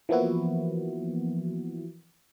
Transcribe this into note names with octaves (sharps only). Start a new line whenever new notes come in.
E3 F3 A#3 B3 E4 F#4